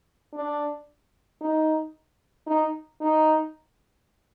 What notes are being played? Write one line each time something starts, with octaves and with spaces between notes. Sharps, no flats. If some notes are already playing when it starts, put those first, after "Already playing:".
D4
D#4
D#4
D#4